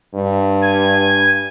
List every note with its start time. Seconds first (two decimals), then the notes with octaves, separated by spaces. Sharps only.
0.15 G2
0.63 G#5